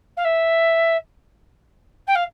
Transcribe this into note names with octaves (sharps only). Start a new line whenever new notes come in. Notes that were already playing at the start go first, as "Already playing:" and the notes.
F5
E5
G5
F5